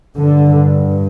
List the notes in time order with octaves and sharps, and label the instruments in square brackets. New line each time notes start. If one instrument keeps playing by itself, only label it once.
[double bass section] G2 D3